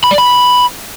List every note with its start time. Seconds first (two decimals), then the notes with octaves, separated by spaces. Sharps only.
0.04 B5
0.11 D5
0.18 B5